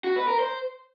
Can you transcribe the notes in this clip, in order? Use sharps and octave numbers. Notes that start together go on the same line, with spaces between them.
F#4
B4
A#4
C5